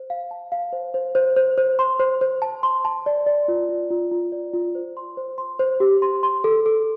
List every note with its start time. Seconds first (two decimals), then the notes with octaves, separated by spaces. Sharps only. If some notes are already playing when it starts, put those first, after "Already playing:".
Already playing: C5
0.10 F5
0.31 A5
0.52 F5
0.73 C5
0.94 C5
1.15 C5
1.36 C5
1.58 C5
1.79 C6
1.99 C5
2.21 C5
2.42 A5
2.63 C6
2.85 A5
3.06 D5
3.26 D5
3.48 F4
3.69 F4
3.90 F4
4.11 F4
4.32 D5
4.54 F4
4.75 C5
4.97 C6
5.17 C5
5.38 C6
5.59 C5
5.80 G4
6.02 C6
6.23 C6
6.44 A4
6.66 A4